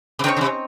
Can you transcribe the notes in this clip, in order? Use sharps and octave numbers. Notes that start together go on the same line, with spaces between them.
C3
C#3 C4 D#4 A#4 C#5
C#3
C3